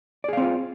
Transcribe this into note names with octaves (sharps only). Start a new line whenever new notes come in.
C4 F4 G#4 D5 F5